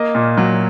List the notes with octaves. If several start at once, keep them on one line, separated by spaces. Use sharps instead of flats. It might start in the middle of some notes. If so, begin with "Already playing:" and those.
Already playing: A#3 D#5
A#2
F#3